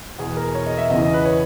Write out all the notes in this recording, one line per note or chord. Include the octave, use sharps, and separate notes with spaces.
E2 B2 G#4
A#4
C#5
D#5
E5
E2 C#3 E3 D#5
D#5
B4
C#5